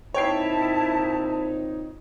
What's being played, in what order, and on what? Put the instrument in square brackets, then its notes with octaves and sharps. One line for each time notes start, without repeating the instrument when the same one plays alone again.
[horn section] A#2 C4 D#4 [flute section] E4 A5 [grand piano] C#5 G5 C7